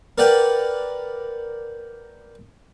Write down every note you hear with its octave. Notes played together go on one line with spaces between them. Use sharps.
A#4 B4 D5 F#5 G5